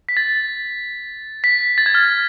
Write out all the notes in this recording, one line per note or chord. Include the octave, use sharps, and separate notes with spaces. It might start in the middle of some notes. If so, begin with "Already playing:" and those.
B6
A6
B6
A6
G#6
F6